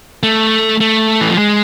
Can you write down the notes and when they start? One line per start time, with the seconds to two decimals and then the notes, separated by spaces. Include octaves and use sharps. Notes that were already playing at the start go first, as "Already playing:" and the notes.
0.23 A3
0.80 A3
1.21 E3
1.30 F3
1.38 G#3